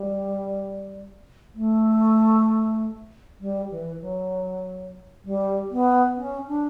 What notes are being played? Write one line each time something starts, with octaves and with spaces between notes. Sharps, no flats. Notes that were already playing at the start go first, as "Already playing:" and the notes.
Already playing: G3
A3
G3
E3
F#3
G3
B3
C#4
D4